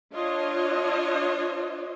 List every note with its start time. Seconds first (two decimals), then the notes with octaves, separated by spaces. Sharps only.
0.14 D4 F4 C#5 D#5